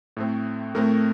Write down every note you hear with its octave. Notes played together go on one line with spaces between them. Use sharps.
A2 A3 C4
A2 A3 C4 A#4